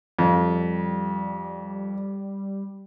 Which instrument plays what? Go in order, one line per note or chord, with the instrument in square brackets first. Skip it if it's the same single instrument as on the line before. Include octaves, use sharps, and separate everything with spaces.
[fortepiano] F2 [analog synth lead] G3